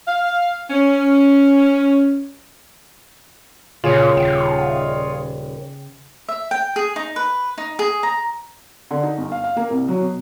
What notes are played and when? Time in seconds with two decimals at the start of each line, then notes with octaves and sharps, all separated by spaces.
0.07 F5
0.70 C#4
3.84 A#2 C#3 F4 G#4 C#5
4.17 D#1 G5
6.28 E5
6.51 G5
6.76 G#4
6.96 D#4
7.16 B4
7.58 D#4
7.79 G#4
8.03 A#5
8.91 D3
9.03 D#4
9.17 G1
9.32 F5
9.44 F5
9.56 A#3
9.70 C2
9.88 F#3
10.01 B2